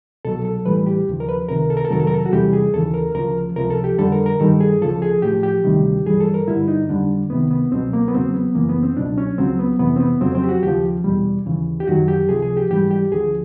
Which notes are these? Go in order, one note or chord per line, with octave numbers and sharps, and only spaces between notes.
C2 B2 F#3 A4
A4
A2 E3 G3 B4
G4
D#2 C#3 F3
A#4
B4
C#2 C3 D#3 A#4
A4
A#4
A4
F2 C3 D#3 F#3 A#4
A4
A#4
A4
F#4
E2 C3 E3 G3 G4
G#4
D#2 C#3 E3 A4
A#4
D2 C#3 F3 A#4
C#2 C3 F3 A#4
A4
G4
F2 D3 G3 A4
A#4
A#4
G2 D#3 G3 A4
G#4
D2 C#3 F3 A4
G#4
A2 F3 G4
G4
D2 C3 D#3 G3
G2 E3 G3 G#4
A4
A#4
G2 D3 G3 E4
D#4
F2 D3 G3 D4
C#2 C3 D#3 B3
B3
C#2 B2 F#3 C4
A#3
B3
E2 C#3 F#3 C4
B3
F#2 C#3 E3 A#3
B3
C4
C#2 B2 F#3 D4
C#4
C#2 C#3 F#3 C4
B3
F2 C3 E3 B3
C4
B3
F2 C#3 F#3 C4
C4
G4
F#4
D#2 C#3 F3 G4
E2 B2 G3
D#2 C#3 E3
G4
F#2 D#3 F#3 F#4
G4
C#2 C3 F3 G#4
G#4
G4
G#2 E3 G3 G4
G4
D2 D3 F3 G#4